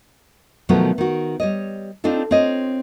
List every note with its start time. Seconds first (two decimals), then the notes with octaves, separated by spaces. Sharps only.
0.69 B2 D#3 F3 F#3 A3 B3
0.98 D#3 F#4
1.40 G3 C#5 D#5
2.04 C4 D4 D#4 F4 A4
2.31 C4 F4 C#5 D#5